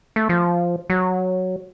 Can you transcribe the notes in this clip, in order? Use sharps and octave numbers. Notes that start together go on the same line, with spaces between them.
A3
F3
F#3